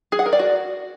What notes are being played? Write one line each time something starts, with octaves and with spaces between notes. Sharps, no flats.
G#4
F#5
A#4
D5
F#4